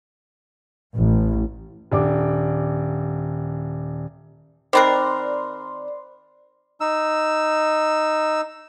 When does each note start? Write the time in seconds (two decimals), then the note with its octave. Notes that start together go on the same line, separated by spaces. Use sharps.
0.97 A1
1.92 D#1 D4 D6
4.73 D#3 C4 A#4 C5 D5 B5 C6 F#6
6.81 D#4 E6